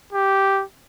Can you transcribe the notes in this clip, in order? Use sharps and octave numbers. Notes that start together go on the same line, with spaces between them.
G4